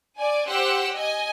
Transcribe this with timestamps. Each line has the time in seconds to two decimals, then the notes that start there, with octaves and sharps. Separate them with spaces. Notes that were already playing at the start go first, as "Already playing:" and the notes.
0.17 D5 G#5
0.47 G4 C5 F#5 E6 F#6
0.93 D#5 G#5